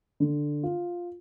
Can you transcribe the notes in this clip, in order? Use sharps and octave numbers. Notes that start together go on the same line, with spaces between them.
D3
F4